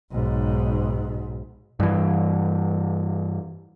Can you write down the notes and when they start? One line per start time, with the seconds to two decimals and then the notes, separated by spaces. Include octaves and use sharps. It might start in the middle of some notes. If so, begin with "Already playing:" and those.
0.12 B1 G#2
1.80 G2 E3